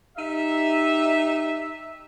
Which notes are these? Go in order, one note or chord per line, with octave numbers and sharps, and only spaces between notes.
D#4 G4 E5